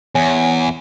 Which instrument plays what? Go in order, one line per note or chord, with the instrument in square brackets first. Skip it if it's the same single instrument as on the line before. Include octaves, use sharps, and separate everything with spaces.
[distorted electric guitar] E2 [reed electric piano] C#5 G#5